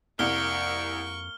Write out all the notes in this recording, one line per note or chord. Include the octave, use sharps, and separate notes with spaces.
C2 F2 A#3 C#6 F6 G7